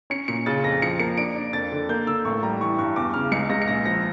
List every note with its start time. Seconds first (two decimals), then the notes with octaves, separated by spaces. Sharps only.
0.10 C#4 C#7
0.28 A#2 C#7
0.46 C#3 A6
0.64 F2 A#6
0.82 F3 C#7
0.99 A#3 C#7
1.17 D4 D7
1.36 D4
1.53 F2 A6
1.72 D3
1.89 A#3 G6
2.07 D3 E6
2.25 A1 C#6
2.43 G3 A#5
2.60 E3 C#6
2.79 G2 C#6
2.96 E2 D6
3.14 C#3 F6
3.32 C#2 C#7
3.50 C#2 A#6
3.62 C#7
3.68 A#1 A#6
3.85 F3 A#6